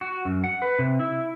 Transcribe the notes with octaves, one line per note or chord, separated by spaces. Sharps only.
F#4
F#2
F#5
B4
C3
E4